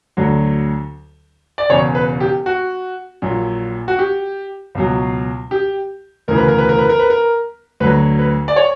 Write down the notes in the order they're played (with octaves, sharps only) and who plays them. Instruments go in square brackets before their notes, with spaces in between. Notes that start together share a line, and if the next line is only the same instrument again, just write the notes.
[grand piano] D2 D3 F#3
D5
E1 E2 C#3 C#5
B4
G4
F#4
A#1 A#2 F#3
F#4
G4
C#2 B2 F#3
G4
E1 D2 C#3 E3 A#4
B4
A#4
B4
A#4
B4
A#4
B4
A#4
D2 D3 F#3 B4
B4
D5
C#5